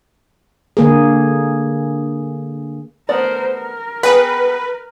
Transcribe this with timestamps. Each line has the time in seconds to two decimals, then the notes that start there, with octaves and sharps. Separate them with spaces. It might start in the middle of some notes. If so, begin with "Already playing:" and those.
0.77 D3 A#3 G#4
3.09 A3 B3 A#4 C5 D5
3.53 A#4
4.03 B3 G#4 B4 G5